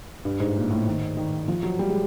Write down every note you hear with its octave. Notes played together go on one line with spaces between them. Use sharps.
G2
G#2
A#2
A2
D#3
D#3
F3
F#3
G3
G#3